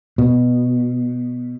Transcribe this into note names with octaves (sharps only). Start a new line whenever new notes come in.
B2